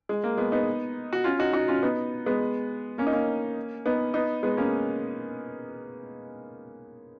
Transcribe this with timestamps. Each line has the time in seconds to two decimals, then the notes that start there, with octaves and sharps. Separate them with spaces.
0.09 G#3
0.24 A#3
0.38 G#3 B3
0.52 B3 D#4
1.13 F#4
1.24 C#4 F4
1.39 D#4 F#4
1.53 D#4 F#4
1.68 C#4 F4
1.83 B3 D#4
2.26 G#3 B3
2.98 A#3 C#4
3.07 D#4
3.13 A#3 C#4
3.86 B3 D#4
4.14 B3 D#4
4.43 G#3 B3
4.57 A#3 C#4